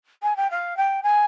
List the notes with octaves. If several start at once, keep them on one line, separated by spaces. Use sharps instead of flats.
G#5
G5
F5
G5
G#5